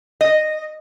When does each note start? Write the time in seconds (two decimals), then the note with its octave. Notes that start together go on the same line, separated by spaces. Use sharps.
0.21 D#5